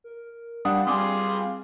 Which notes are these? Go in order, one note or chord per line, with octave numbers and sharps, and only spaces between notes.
A#4
G3 D4 F5 F#5 D#6
G3 C4 G#4 F5 G#5 C6 D6 D#6